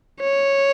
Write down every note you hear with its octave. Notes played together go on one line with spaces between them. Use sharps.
C#5